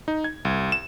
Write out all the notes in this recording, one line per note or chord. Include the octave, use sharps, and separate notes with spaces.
D#4
G#6
C2
E7